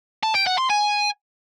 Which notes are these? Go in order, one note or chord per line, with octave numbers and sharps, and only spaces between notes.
A5
G5
F#5
C6
G#5